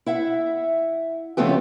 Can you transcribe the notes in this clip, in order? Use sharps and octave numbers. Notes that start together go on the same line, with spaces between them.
E4 E5 F#5
F2 C#3 F3 A3 B3 G4